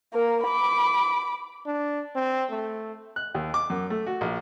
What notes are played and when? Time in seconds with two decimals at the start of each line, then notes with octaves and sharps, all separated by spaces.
0.13 A#3 A#4
0.44 B5 D6
1.66 D4
2.15 C4
2.50 A3
3.16 F#6
3.35 D#2
3.54 D6
3.70 F#2
3.90 A3
4.07 F#4
4.21 A#1